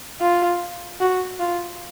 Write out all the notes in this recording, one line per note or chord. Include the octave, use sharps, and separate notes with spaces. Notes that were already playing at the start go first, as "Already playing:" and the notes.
F4
F#4
F4